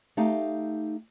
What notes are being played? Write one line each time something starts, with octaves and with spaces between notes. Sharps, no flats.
A3 D#4 G4 F5